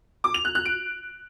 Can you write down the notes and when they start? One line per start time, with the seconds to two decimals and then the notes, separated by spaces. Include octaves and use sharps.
0.24 D6
0.34 F7
0.45 F#6
0.55 F#6
0.65 D7